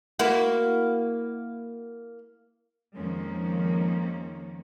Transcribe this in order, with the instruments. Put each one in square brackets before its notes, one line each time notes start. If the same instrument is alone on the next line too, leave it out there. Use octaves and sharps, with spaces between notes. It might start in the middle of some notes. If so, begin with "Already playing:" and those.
[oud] A#3 E4 F#4
[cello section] F2 D#3 F3 G#3 A#3 C#4